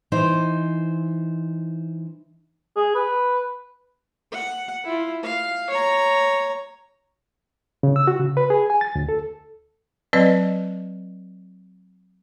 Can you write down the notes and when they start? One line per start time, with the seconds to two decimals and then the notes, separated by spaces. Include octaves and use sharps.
0.12 E3 D#4 C5
2.76 G#4
2.95 B4
4.32 F#5
4.84 E4 F4
5.23 F5
5.70 C#5 A#5
7.83 C#3
7.96 E6
8.07 F#4
8.19 C#3
8.37 B4
8.50 G#4
8.70 G#5
8.81 A6
8.95 D2
9.09 A4
10.13 F#3 C4 B4 D5 D#5